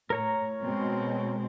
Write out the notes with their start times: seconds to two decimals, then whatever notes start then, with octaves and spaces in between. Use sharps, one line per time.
0.10 A2 A#4 C#5 A#5
0.63 B2 G#3 C4